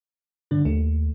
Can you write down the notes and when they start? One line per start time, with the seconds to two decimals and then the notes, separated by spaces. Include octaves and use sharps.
0.51 G2 D3 D4
0.65 D#2 A3